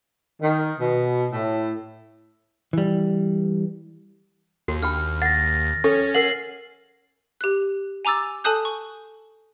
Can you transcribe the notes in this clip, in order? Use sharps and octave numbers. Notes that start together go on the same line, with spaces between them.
D#3
B2
A2
E3 G3
D#2 F#4
D4 G5 B5 F6
F#5 A6 A#6
C#4 A4 G5 C#6
A#4 F#5 C7 F#7
G4 F#6
G#5 A#5 D6 E6 A6
A4 G#5 A5 D#6 F#6 G6
C#6